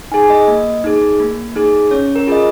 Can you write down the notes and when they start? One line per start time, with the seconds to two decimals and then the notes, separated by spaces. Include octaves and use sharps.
0.12 D#4 G#4 G#5
0.30 D#5
0.48 A#3
0.84 D#4 G#4
1.20 A#3
1.55 D#4 G#4
1.91 C#4 C#5
2.16 A#4
2.27 F4 G#4 D#5